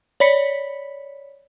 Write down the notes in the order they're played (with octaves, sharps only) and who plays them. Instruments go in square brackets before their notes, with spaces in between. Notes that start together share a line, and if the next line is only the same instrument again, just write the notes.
[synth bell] C#5 D5 B5 B6 C#7